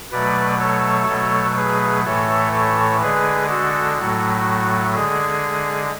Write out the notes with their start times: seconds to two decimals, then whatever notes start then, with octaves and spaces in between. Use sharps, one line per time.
0.11 B2 F#3 A3 B4 D5
0.59 A4 C#5
1.08 B2 F#3 A3
1.56 G#4 B4
2.05 A2 E3 A3 A4 C#5
2.53 A4 C#5
3.01 D3 G#3 G#4 B4
3.49 F#4 A4
3.99 A2 F#3 A3 F#4
4.95 D3 G#3 G#4